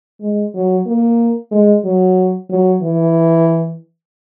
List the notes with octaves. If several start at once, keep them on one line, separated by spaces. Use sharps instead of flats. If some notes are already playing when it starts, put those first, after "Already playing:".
G#3
F#3
A#3
G#3
F#3
F#3
E3